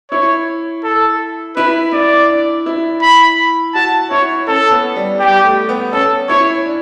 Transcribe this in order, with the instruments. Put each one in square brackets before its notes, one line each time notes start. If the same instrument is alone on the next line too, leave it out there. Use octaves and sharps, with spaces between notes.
[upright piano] E4 [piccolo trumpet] C#5
[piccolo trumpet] A4
[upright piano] E4 [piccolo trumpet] B4
[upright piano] E4 [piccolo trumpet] D5
[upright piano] D4
E4
[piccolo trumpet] B5
[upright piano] F#4 [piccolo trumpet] A5
[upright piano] E4 [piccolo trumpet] C#5
[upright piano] C#4 [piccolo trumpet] A4
[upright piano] B3
G3
[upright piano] G3 [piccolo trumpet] G4
[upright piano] A3
B3
[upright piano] C#4 [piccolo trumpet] A4
[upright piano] E4 [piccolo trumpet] C#5
[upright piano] D4